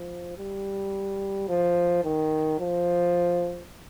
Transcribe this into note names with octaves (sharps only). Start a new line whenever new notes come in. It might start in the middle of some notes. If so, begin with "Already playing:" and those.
Already playing: F3
G3
F3
D#3
F3